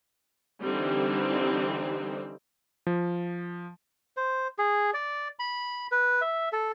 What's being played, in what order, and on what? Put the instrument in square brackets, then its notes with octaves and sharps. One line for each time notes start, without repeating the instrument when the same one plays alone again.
[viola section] D3 E3 G3 C4 D#4
[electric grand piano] F3
[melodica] C5
G#4
D5
B5
B4
E5
A4